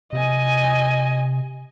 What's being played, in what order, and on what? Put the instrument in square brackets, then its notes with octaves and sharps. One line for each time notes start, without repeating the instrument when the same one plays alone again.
[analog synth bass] C3 [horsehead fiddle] D#5 G#5